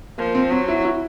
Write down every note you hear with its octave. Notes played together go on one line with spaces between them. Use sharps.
F3 A#3
C4
F#3 C4
E4
E4